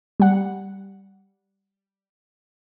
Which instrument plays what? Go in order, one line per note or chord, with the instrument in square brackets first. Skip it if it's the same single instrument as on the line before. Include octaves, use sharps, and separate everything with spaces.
[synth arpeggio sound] G3 F#5